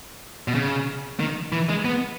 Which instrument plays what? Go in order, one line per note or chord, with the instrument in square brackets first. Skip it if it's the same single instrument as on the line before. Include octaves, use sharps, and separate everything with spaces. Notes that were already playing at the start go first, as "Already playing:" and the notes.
[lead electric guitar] B2
C#3
D#3
E3
G#3
B3